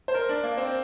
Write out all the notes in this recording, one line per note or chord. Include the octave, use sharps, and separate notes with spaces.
C5
A#4
D4
A#3
C4